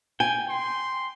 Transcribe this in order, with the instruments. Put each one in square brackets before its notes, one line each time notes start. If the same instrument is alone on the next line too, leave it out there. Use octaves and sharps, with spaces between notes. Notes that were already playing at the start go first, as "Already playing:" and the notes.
[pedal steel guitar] G5 [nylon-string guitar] G#5
[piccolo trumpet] C6